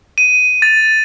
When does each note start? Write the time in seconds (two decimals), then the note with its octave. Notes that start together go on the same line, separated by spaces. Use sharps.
0.18 D#7
0.62 A6